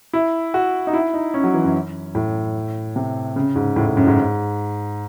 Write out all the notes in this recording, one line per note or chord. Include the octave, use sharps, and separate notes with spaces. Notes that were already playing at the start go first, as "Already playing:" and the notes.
E4
F#4
D#4
E4
D#4
C#4
F#3
E3
F#2
A2
C3
C#3
G#2
A2
A2
F#2
G#2